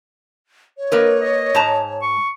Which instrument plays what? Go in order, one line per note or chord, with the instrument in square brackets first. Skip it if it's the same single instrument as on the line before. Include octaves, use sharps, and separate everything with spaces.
[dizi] C#5
[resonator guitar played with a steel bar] A#3 A#4 B4 [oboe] D#5
[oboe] D#5
[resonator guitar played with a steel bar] G#2 A5 A#5
[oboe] C#6